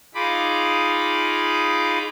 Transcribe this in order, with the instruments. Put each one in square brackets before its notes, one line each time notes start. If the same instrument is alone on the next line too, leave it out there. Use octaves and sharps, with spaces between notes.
[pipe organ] D#4 F4 G#4 B5 D6